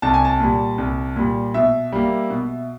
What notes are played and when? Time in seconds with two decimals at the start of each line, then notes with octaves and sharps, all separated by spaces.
0.02 C2 A5
0.14 G#5
0.25 A5
0.40 A#2 G3
0.78 C2
1.16 A#2 G3
1.54 B2 E5
1.92 G3 A#3
2.30 B2